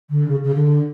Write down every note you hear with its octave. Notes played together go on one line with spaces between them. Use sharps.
D3
C#3
C#3
D3